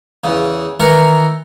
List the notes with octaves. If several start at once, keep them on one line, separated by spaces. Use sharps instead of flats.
E2 C#3
D#3 E3 A#4 A#5 C#6